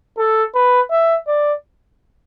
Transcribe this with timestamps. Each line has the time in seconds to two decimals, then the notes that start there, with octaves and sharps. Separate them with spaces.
0.18 A4
0.55 B4
0.91 E5
1.27 D5